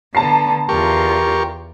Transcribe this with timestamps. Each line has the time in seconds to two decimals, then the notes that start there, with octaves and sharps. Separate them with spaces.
0.15 D3 B3 A5 A#5 C7
0.69 E2 F4 G4 A#4 C#6